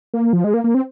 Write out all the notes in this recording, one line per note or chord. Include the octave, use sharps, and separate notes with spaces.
A#3
F3
G#3
A#3
A#3
C4